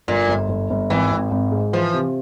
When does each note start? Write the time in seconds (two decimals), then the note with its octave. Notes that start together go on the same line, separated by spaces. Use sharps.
0.08 G1 A#2
0.29 G1
0.49 G1
0.70 G1
0.90 G#1 E3
1.11 G#1
1.31 G#1
1.52 G#2
1.73 E3 F3
1.94 C3